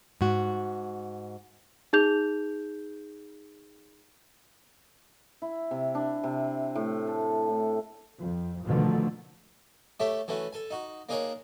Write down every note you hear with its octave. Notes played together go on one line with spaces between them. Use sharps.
G#2 F#4
D#4 G#4 G6 F7
E4
C3
D4
C3
A2
A4
A2
F2
B2 D3 D#3 F3 A3
A3 G4 A4 C#5 E5
E3 A3 C#4 F#4
A4 G#5
D#4 F#4
A#3 D4 D#4 G#4 A#4 C#5